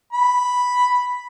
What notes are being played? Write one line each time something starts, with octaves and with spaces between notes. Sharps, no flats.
B5